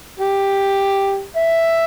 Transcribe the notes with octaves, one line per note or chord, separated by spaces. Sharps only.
G4
E5